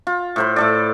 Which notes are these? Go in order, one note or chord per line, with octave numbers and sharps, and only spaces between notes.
F4
A2 C5 B5
A2 A4 D5